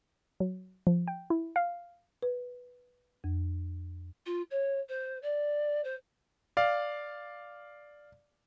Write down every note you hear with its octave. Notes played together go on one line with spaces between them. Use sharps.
F#3
F3
G5
E4
F5
B4
F2
F4
C#5
C5
D5
C5
D5 F5